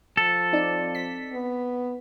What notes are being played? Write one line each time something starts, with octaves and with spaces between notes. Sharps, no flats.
F3 A4
C4 D#4 D5
B6
B3